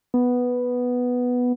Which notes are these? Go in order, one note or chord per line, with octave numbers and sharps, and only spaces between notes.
B3